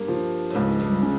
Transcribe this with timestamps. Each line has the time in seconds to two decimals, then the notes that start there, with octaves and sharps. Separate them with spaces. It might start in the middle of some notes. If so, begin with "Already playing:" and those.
Already playing: G2 A#3
0.08 F3
0.50 A2
0.55 C#2 G#2
0.80 G2
1.03 C#3